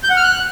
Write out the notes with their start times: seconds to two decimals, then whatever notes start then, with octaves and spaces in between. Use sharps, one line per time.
0.03 G6
0.10 F#5
0.17 F6
0.23 F#6